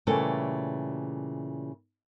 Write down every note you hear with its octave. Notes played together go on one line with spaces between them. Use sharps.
A#2 C#3 E3 G3 A3 A4